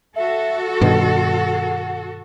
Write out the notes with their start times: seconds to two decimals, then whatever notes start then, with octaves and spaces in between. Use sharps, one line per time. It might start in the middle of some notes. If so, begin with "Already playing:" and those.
0.16 F#4 A4 E5
0.81 G2 B2 D#3 F#5